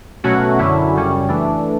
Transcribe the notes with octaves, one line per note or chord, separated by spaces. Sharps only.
B2 F#3 A3 C#4 F#4
F#2 D3 F#3 C#4 E4
F#2 C#3 G3 C#4
E3 A3 D4